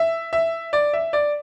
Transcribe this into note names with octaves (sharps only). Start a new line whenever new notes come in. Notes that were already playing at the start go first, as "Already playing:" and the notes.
Already playing: E5
E5
D5
E5
D5